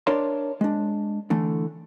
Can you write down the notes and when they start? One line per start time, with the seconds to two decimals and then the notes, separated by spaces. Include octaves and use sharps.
0.07 D4 A#4 C#5 D5 E5 C6
0.61 G#3 D4
1.30 D3 E3 A3